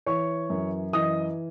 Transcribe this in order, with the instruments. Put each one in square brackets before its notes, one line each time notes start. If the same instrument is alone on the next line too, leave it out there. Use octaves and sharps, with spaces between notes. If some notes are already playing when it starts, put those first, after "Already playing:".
[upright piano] E3 C#5 C#6
F#2
E3 D#5 D#6